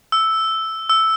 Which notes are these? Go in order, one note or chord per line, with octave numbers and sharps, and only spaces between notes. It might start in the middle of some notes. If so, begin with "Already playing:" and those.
E6
E6